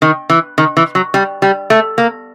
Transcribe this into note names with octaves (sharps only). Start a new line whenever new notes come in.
D#3
E3
D#3
E3
F#3
G3
G3
A3
A#3